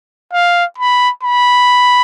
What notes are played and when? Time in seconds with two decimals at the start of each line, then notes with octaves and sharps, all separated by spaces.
0.33 F5
0.78 B5
1.23 B5